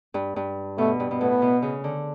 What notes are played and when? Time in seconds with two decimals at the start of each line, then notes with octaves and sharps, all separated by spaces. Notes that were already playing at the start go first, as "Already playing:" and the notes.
0.14 G2
0.36 G2
0.78 B2 A3
1.00 G2
1.11 B2
1.20 A2 B3
1.42 B2
1.62 C#3
1.84 D3